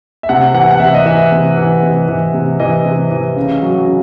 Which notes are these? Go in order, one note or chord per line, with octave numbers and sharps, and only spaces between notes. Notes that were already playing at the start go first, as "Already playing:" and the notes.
E5
C3 F#5
E3 F#5
F#5
C3 E5
D#5
E3 E5
C3
E3
C3
E3
C3
E3 D#5
C3
E3
C#3
F#3
C#3